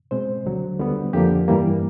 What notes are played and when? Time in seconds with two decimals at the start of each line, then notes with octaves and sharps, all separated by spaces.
0.11 B2 G#3 C4 C5
0.45 D2 D3 F#3
0.79 D2 D3 G3 B3
1.13 F2 D3 F3 A#3 G4
1.48 G2 E3 G3 A#3